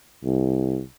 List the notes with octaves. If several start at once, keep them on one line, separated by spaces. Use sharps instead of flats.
C2